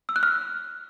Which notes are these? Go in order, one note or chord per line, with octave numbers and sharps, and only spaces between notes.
E6
F#6
F6